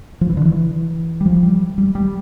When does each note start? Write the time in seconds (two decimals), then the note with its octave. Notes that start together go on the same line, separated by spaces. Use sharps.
0.21 F3
0.29 E3
0.37 D3
0.45 E3
1.21 G3
1.26 F3
1.43 G3
1.78 G3
1.95 G3